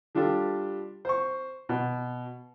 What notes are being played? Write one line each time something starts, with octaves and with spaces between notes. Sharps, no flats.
G3 D4 F4 G4 A4
C5 C#6
B2